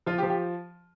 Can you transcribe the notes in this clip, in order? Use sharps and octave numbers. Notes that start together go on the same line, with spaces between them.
F3 F4
G4
F3
G4